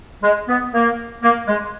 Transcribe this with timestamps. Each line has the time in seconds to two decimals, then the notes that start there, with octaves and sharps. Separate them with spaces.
0.22 G#3
0.48 B3
0.73 A#3
1.23 A#3
1.48 G#3